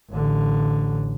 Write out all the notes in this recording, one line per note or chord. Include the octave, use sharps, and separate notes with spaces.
A1 D3